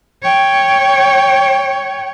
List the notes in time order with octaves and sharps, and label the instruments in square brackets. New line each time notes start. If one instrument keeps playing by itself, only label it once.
[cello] C#5 G5